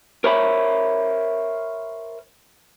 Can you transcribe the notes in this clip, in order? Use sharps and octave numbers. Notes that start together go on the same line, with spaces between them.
A#4 C5 C#5 E5 A#5 B5